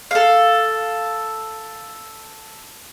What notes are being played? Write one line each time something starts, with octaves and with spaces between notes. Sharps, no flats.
A4 F5